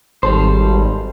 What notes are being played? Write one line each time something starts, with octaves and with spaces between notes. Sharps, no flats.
G#1 G3 A4 C5